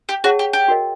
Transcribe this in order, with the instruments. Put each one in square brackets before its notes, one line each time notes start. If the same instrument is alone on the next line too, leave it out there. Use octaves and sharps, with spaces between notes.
[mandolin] G4
[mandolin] F#4 [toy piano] G#4 C#5 F#5 A5
[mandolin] G4
G4
[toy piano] F#4 A#4 D#5